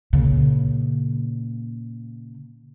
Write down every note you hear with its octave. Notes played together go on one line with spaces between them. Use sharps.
A#2 C#3